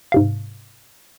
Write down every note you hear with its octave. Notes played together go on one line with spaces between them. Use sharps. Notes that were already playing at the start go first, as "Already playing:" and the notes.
G#2 C3 F5